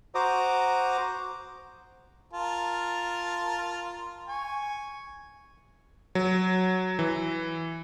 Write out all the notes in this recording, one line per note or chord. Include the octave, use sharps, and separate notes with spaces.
F#4 C5 A#5 D6 D#6
F4 A#4 A5
G#5 C#6
F#3
E3